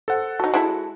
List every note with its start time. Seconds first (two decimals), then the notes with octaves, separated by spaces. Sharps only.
0.08 A4 C5 F#5
0.40 D#4 F#4 A4
0.54 G#3 E4 A4